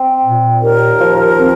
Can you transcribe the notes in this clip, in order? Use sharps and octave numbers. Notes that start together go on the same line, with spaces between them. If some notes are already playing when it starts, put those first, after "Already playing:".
Already playing: C4
A#2
D#2 A#4
F3
C4